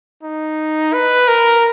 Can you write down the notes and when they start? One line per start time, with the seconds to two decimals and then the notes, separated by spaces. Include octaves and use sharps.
0.23 D#4
0.93 B4
1.28 A#4